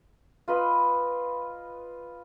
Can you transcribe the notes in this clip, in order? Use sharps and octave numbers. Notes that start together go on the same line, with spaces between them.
F4 B4 D#5 B5